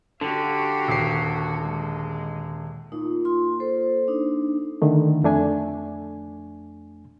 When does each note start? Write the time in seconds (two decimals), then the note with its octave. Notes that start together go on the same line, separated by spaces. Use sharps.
0.21 D3 F#4 G4 F5
0.88 D#1 C7
1.62 G#3
2.92 A#2 D#4
3.25 F4 C6
3.60 A4 C5
4.08 D4 D#4
4.82 D3 D#3 A3
5.23 F2 A3 D4 G#5